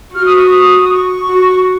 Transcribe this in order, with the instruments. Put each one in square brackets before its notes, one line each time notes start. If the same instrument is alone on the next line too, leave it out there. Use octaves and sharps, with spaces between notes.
[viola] F#4 [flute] F6
[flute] D#6
C#6
D#6
D#6
C#6
[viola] F#4